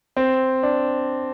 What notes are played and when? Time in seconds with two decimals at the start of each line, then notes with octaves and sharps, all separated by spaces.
0.17 C4
0.63 D4